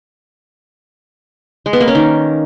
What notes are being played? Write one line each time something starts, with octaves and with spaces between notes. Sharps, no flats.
G#3
B3
A#3
C#4
D#3